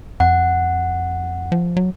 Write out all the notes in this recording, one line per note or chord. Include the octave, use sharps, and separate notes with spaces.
F2 F#5
F3
F#3